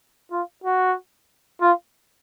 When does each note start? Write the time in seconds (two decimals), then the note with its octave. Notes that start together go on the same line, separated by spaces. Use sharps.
0.32 F4
0.64 F#4
1.62 F4